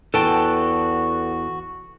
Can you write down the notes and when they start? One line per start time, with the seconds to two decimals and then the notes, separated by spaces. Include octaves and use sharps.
0.14 E2 F#4 A4 B4 G5 A5